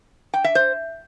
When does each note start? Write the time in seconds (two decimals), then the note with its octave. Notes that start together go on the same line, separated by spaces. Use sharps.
0.34 G5
0.44 E5
0.55 C5